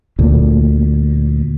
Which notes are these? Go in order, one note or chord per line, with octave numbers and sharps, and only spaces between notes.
D2 A#2